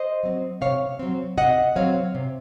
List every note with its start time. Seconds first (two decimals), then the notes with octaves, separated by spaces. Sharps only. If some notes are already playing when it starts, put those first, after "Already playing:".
Already playing: C5 D#5
0.23 F#3 C4
0.61 C3 C#5 F5
0.99 F#3 C4
1.38 C3 D#5 F#5
1.76 F#3 C4 C#5 F5
2.15 C3